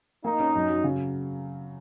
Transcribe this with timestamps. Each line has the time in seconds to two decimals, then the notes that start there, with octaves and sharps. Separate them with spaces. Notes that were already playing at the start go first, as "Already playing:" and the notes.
0.25 A#3 D#4
0.40 C#4
0.55 F#2
0.70 F#3
0.84 C#3